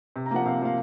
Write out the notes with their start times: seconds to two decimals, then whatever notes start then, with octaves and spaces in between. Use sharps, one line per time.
0.16 C3
0.26 A#5
0.31 F3 A#3 F#5
0.46 C3 F5
0.61 F3 A#3 F5